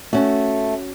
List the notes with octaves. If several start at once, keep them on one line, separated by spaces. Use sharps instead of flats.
A3 C#4 F#4